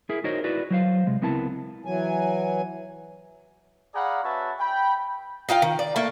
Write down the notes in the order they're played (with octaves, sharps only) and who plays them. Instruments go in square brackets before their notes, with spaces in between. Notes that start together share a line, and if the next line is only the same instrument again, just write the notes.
[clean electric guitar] E4 G#4 A#4
D#4 F#4 A#4 C5 C#5 D#5
E4 F#4 B4 D5
F#3 C5 F5
C3 G#3
C#2 B3 C4 E4 A#4 A5
[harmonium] E3 F#3 G#5
[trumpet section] G#4 D5 F5 F#5 A#5 B5
C#4 F#4 B4 C#5 E5 A5
G5 B5
[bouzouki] D#4 F4 F5 G5
D#3
D5
A3 A#3